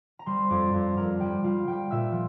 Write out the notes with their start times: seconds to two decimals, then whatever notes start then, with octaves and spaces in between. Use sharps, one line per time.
0.19 A#5
0.26 G3 C5 C6
0.50 F2 D5 D6
0.74 F2
0.97 F2 A#4 A#5
1.20 G3 G4 G5
1.44 G3 F4 F5
1.68 G3 G4 G5
1.91 A#2 E5 E6
2.12 F3